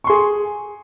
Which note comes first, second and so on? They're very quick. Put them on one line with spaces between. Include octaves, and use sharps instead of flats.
C#6 C6 G#4